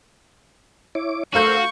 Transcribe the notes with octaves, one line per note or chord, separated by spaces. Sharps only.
E4 C#5 D6
A3 F#4 A#4 C5 F5 C#6 E6 G6